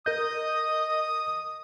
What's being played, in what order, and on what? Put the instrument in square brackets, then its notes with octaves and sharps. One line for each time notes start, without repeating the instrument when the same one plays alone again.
[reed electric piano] A#4 G6 [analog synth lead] D#5 [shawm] D#6